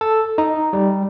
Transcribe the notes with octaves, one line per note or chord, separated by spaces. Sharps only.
A4
D#4
G3